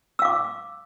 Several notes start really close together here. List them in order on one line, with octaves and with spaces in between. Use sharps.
E6 F5 D6